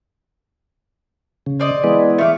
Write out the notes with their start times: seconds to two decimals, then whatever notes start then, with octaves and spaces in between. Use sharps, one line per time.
1.46 C#3
1.60 C4 D5 D#5
1.84 E3 G#3 B3
2.18 A3 F5 D6